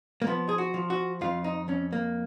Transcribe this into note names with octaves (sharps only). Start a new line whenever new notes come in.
A#3
F3 B3
G#4
F#4
F3
F#4
F2 F4
D#4
F2 C#4
A#3